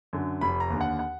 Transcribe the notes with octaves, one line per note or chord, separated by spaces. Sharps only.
F#2 D3
F1 B5
A#5
D#2 D3
F#5
F#5